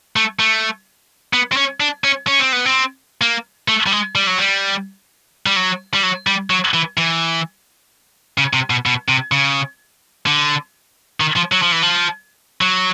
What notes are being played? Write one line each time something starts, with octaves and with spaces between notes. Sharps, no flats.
A3
A3
B3
C4
C#4
D4
C#4
C#4
C4
B3
C4
A#3
A3
G3
G#3
G3
F#3
G3
G3
F#3
G3
F#3
G3
F#3
E3
E3
C#3
C3
B2
B2
C3
C#3
D3
D#3
F3
F#3
F3
E3
F3
F#3